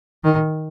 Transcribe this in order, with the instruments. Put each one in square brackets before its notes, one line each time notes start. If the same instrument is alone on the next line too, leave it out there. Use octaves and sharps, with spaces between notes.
[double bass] D#3